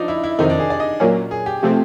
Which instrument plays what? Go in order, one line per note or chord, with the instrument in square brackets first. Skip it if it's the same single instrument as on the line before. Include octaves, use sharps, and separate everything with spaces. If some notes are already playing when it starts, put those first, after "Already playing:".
Already playing: [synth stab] F3 [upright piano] D4 D#4
[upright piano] E4
E4
[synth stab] F2 C3 D#3 [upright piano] D#4
[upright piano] D4
G#4
D5
D#5
[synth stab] A#2 F#3 A#3 C#4
[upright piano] G#4
G4
[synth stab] C3 F3 A3 C4